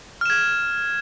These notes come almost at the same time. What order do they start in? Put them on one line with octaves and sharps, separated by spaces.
F6 E7 G#6